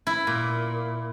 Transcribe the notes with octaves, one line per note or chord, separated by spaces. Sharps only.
E4
A#2